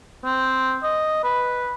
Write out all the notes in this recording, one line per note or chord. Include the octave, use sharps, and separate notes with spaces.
C4
D#5
B4